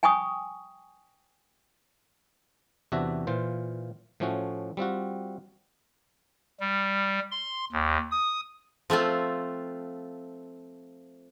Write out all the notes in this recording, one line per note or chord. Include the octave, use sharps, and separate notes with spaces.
G5 G#5 B5 C#6 D#6
E2 C3 D4 F#4 E5
A#2 E3 F4 C5
A2 F3 A3 C#4 F#4
G3 C4 F4 F#4
G3
C6
D#2
D#6
F3 A3 C4 F4